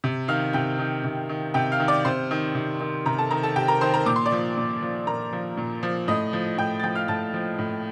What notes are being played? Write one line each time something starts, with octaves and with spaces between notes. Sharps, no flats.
C3
D#3 F5 F6
C3 G5 G6
D#3
C3
D#3
C3 G5 G6
F5 F6
D#3
D5 D6
C3 C5 C6
D#3
C3
D#3
C3 A#4 A#5
A4 A5
D#3 A#4 A#5
A4 A5
C3 G4 G5
A#4 A#5
D#3 C5 C6
A#4 A#5
A#2 D6
C6
D5 D6
F3
A#2
F3
A#2 A#4 A#5
F3
A#2
F3
A2 D#5 D#6
F3
A2 G5 G6
A6
F3 G5 G6
F5 F6
A2 A5 A6
F3
A2